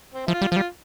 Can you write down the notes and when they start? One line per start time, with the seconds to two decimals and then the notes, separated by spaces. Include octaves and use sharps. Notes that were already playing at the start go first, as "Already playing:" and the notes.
0.14 C4
0.27 F3 E4
0.33 F4
0.41 G3
0.51 F3 F4
0.56 G3